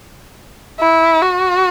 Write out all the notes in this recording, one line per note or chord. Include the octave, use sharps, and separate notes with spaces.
E4
F#4